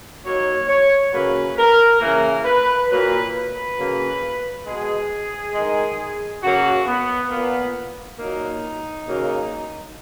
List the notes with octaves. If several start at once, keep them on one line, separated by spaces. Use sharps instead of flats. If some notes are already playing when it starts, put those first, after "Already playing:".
D#3 F#3 A#3 C#5
C#5
C#3 F#3 A#3 B4
A#4
C#3 E3 A#3 A#4
B4
A#2 F#3 A#3 B4
B4
C#3 F#3 A#3
B2 G#3 G#4
D#3 G#3
C#3 F#3 A#3 F#4
B3
A#2 A#3 B3
A#2 F#3 A#3 D#4
C#3 F#3 A#3